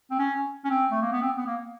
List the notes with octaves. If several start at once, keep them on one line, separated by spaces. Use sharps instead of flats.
C4
C#4
C#4
C4
A3
A#3
B3
C4
B3
A#3